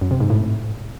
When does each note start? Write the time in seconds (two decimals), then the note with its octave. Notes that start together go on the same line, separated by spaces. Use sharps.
0.01 F#2
0.11 C3
0.20 G#2
0.30 A2